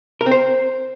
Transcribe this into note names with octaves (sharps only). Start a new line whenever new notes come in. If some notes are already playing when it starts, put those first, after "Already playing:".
A#4
C4
C5